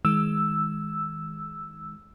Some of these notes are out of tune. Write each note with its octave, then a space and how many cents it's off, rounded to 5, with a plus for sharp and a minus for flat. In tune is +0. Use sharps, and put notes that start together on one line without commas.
D#3 +35 G#3 +0 E6 +0